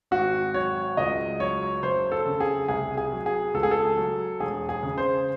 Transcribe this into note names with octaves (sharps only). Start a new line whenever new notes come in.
G#1 F#4
F#3 C#5
C#2 D#5
F#3 C#5
F#1 C5
A4
C#3
G#4
C2 G#4
G#4
F#3
G#4
C#2 A4
G#4
A4
F#3
E1 G#4
G#4
C#3
C5